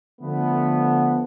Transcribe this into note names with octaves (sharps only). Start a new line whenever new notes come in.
D3 F3 A3 B3